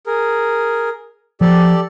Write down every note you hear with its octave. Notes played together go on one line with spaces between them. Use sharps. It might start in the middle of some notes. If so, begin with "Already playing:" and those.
G#4 A#4
F3 G4 A4 D5